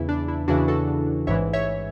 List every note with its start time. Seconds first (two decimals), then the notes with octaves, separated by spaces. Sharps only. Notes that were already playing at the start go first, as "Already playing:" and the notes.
Already playing: E2 C#3 E3 E4
0.09 D4
0.28 E4
0.48 E2 C#3 E3 D4 F#4
0.68 F#4 A4
1.27 A1 G#2 E3 C#5 E5
1.53 C#5 E5